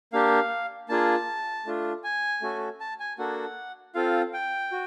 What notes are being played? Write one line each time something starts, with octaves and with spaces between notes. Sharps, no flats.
A#3 D4 G4 F5
A#3 D4 F4 G#4 A5
A3 D4 F4
G#5
A3 C#4 F#4 A4
A5
G#5
A#3 D4 F#4 A4 F#5
C4 F4 A4 F5
G5
F#4